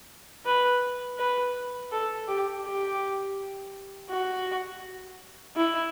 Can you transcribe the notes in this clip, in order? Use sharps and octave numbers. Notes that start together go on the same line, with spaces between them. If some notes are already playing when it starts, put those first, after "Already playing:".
B4
B4
A4
G4
G4
F#4
E4